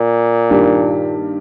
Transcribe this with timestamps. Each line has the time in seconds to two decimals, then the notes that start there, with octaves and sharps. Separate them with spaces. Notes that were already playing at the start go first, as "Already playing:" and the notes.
Already playing: A#2
0.49 G2 D#3 A#3 D4 G4